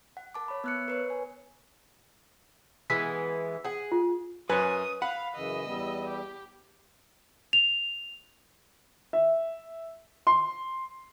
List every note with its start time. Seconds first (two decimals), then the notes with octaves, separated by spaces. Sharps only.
0.17 F#5
0.34 A#4 A5 D6
0.48 C#5 B5
0.64 B3 F#6 C#7
0.88 A#4 B4 C#5
1.10 G#5
2.90 E3 G#3 B3 B6
3.64 G#4 F#5
3.92 F4
4.50 F#2 B4 C#5 G#5 D#6 F#6
5.02 F5 F#5 B5
5.35 F#2 C#3 E3 D#5 E6
5.65 E2 G3 B3
6.07 G4
7.53 F7
9.13 E5
10.27 C6